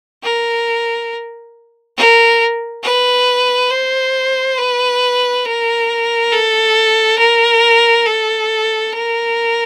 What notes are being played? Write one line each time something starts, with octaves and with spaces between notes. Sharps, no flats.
A#4
A#4
B4
C5
B4
A#4
A4
A#4
A4
A#4